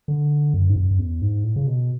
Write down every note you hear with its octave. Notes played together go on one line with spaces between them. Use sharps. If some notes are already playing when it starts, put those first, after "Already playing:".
D3
F#2
G#2
F#2
F#2
E2
G#2
A2
C#3
B2